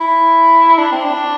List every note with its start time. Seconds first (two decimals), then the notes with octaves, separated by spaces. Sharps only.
0.01 E4
0.78 D4
0.92 C4
1.05 D4